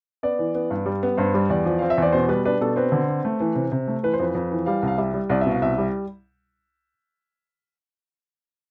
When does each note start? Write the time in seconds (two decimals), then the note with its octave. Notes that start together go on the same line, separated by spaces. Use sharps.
0.23 B3 D5
0.39 E3
0.55 B3
0.71 G2
0.86 G3
1.03 B3
1.17 G2 C5
1.34 G3
1.50 E2 D5
1.65 F3
1.79 C4 F5
1.90 E5
1.98 E2 D5
2.13 B2 C5
2.28 G3 B4
2.45 D4 B4
2.61 B2 A4
2.76 C4 B4
2.92 D3
3.08 C4
3.25 A3
3.40 E3
3.55 C3
3.72 C3
3.88 A3
4.03 E3 B4
4.13 C5
4.19 F2 B4
4.35 F2
4.51 E3
4.66 G3 F5
4.83 C2 F5
4.98 G3 E5
5.14 G3
5.30 C2 D5
5.41 E5
5.46 B2
5.51 F5
5.62 C2 E5
5.78 G3